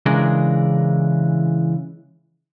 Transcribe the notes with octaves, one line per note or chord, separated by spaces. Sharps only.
C#3 E3 G#3 D4 G#4 A#4